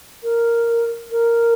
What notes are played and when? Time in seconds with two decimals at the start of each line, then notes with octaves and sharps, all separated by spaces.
0.23 A#4
1.10 A#4